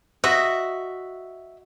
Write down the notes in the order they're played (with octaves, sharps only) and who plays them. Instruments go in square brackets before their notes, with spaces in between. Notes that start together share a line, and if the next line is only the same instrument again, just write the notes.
[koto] F#4 D#5 F#5 [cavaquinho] E5